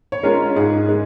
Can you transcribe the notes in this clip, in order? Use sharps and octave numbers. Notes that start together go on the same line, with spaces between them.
C#5
G#3 C#4 F4 A#4
G#2 G#4
G#3